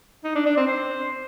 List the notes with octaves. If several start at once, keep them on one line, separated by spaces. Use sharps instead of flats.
D#4
D4
D4
C4
C5